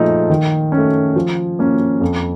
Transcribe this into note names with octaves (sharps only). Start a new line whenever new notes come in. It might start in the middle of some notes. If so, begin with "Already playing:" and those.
Already playing: A#2 F3 A3 D#4 A4
D#3
C#4
A3
F3
A#3 C#4
F2